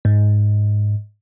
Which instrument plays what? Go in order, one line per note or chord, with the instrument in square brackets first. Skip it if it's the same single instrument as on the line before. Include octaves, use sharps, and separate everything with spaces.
[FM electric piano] G#2